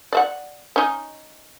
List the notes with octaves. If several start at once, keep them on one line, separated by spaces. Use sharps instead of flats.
D5 E5 F#5
C#4 D#4